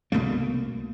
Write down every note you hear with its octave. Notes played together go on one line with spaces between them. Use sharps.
C2 B2 A3 A#3